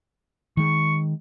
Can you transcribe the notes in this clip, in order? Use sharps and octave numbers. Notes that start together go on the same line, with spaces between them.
D#3 G#3 C#6